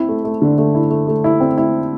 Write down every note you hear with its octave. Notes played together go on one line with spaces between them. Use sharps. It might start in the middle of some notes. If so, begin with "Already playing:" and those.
Already playing: C4 E4
A3
A3
D3
A3
E4
A3
A3
E4
C4
E4